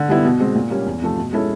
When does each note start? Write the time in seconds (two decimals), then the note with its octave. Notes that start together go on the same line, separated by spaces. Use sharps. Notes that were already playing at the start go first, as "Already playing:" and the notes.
Already playing: D3
0.08 G3 B3 E4
0.25 B2
0.40 G#3 C4
0.55 A#2
0.71 G3 A#3 C#4
0.86 E2
1.02 C3 F3 A3
1.18 B2
1.33 G#3 C#4 E4 A4